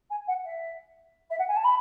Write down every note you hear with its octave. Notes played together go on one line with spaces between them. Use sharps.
G#5
F#5
E5
E5
F#5
G#5
A5
B5